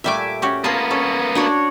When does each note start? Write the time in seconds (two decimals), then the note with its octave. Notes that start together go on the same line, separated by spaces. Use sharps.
0.04 A#2 G3 A3 E5 G#5 D6
0.42 C#4 F#4 G4
0.64 A#3 B3 F4 G#4 A5
0.90 C#4 A4
1.35 D4 F#4 C#5